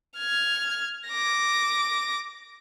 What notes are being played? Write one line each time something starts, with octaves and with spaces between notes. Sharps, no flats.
F6 G#6
D6 A#6